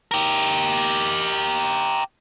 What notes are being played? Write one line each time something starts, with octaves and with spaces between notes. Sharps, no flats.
G4 A#4